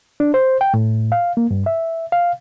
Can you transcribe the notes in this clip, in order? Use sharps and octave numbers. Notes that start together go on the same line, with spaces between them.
D4
C5
G5
A2
F5
A#3
G2
E5
F5